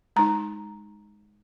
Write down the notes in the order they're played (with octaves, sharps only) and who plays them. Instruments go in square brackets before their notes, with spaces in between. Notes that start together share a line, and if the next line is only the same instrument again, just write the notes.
[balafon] G#3 D#4 A#5